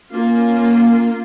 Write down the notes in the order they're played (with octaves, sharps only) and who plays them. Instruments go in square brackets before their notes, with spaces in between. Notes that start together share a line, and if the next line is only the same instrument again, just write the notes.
[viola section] A#3 F4 [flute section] C#4